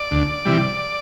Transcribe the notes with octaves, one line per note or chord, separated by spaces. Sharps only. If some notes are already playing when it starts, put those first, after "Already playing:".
Already playing: D5
D2
C3 E3 G3